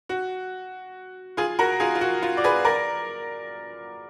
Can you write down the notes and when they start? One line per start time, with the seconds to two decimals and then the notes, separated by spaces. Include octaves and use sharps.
0.09 F#4
1.37 F4 G#4
1.59 F#4 A#4
1.80 F4 G#4
1.95 F4
2.01 F#4
2.22 F4
2.37 D5
2.44 G#4 B4
2.65 A#4 D5